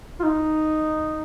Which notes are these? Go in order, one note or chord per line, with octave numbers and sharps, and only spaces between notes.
F4
D#4